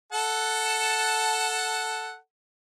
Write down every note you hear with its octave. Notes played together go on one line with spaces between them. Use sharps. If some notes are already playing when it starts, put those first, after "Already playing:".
A4 F#5 A5